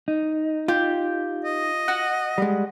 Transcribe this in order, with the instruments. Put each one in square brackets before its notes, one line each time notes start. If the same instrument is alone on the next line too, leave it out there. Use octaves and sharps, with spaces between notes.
[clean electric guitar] D#4
[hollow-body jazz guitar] F4 [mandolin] G4
[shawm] D#5
[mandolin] F#4 F#5
[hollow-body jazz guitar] G3 G#3